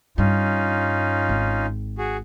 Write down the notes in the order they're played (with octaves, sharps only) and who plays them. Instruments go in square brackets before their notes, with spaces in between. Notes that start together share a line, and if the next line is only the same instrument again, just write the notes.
[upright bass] G2 [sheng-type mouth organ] C#4 D#4 F4
[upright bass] G#1
[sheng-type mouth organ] F#4 G#4